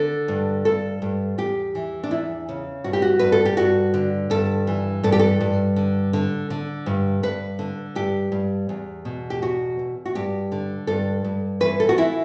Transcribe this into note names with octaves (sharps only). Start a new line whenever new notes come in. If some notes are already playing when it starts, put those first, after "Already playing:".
Already playing: D3 A4
G2
G2 A4
G2
E2 G4
E3
D4
E2 E4
C#3
G2 F#4
G4
F#4
G2 B4
A4
G4
G2 F#4
D3
G2 A4
E3
G2 A4
G4
A4
G2
D3
D3
D3
G2
G2 B4
D3
G2 G4
G2
E2
B2
G4
E2 F#4
E2
F#4
G2 G4
D3
G2 A4
G2
E3 B4
A4
F#4
E3 E4